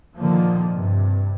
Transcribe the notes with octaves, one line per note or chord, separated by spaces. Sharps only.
A#2 D3 D#3 F3 A#3
G2 C3